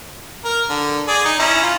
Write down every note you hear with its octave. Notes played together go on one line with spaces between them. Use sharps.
A#4
D3
G#4 D5
D#4
C#4 E4 A#5
F4